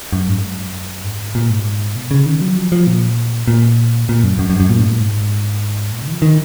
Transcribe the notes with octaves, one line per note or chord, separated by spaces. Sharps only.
F#2
G#2
F#2
G#2
A#2
G#2
B2
C#3
D#3
F#3
F3
F3
A#2
A#2
A#2
F#2
F#2
F#2
F#2
A#2
G#2
A#2
G#2
A#2
C#3
D#3
F3
D#3